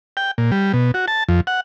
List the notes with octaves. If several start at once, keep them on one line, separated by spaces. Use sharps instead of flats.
G5
A#2
G3
B2
F#4
A5
F2
F#5